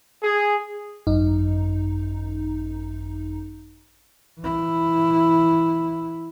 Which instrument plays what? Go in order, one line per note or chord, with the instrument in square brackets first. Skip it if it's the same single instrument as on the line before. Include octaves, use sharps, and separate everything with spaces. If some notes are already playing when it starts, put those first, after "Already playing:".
[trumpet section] G#4
[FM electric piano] G#1 F#2 D#4
[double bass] E3 E4